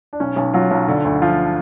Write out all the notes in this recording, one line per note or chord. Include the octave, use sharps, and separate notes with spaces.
D4
B1 C#4
B1 C#4
F#3 F4
B1
D3
D2
F3 F4